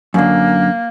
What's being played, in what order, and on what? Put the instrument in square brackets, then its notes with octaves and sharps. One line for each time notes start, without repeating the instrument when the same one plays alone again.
[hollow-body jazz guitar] F#2 D3 [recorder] A#3